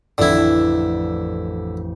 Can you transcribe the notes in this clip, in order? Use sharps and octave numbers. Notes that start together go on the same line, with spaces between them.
A1 F2 A2 D3 E4